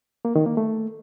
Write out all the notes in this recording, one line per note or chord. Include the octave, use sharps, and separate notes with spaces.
A#3
D#3
A#3
A3